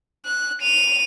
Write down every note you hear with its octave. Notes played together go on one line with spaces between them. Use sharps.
F#6
D#7 F7